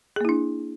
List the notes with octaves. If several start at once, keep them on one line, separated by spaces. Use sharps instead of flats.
A#3 D4 E4 G#4